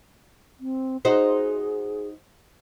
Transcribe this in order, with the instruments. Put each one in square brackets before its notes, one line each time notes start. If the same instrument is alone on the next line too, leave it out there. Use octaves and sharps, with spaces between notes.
[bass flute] C4
[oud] D#4 F#4 C5 [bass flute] G#4